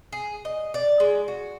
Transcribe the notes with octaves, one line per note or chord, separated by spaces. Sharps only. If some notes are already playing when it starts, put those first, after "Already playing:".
G#4
D#5
D5
G#3
F#4